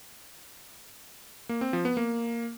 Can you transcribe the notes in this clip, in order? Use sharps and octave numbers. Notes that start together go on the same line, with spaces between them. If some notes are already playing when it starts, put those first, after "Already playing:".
A#3
C4
F3
B3
A#3